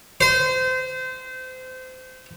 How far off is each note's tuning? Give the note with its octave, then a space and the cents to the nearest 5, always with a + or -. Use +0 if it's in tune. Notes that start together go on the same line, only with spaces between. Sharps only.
C5 -25